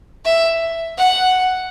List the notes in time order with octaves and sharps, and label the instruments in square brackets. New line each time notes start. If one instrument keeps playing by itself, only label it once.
[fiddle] E5
F#5